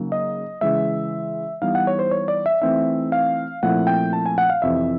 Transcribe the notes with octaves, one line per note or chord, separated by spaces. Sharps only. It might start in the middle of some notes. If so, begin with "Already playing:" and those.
Already playing: C#3 F#3 A#3 D#4
D#5
C#3 E3 G#3 E5
E3 G3 B3 D#4 F5
F#5
C#5
C5
C#5
D5
E5
E3 A3 C4 D#4 E5
F5
A#2 F3 A3 C4 E4 F#5
G5
A5
G#5
F#5
F5
F2 C3 E3 E5